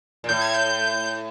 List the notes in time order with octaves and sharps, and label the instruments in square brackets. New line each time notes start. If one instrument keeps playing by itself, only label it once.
[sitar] A#2
[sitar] A2 [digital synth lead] G6
[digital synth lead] G#6
G6